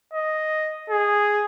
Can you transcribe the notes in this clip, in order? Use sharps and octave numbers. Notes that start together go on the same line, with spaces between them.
D#5
G#4